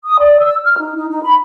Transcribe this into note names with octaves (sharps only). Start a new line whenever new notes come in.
D#6
D5
E6
F6
D#4
D#4
D#4
B5